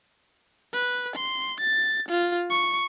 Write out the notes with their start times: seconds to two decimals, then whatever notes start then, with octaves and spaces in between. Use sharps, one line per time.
0.73 B4
1.15 C6
1.60 A6
2.08 F4
2.50 C#6